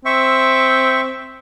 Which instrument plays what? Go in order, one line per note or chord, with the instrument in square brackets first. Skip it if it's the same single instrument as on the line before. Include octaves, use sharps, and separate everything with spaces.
[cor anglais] C4 [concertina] E5 C#6